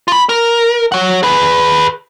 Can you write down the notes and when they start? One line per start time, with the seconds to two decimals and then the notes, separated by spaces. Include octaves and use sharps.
0.08 F4 B5
0.29 A#4
0.92 C#5 F#5
1.23 G#4 B4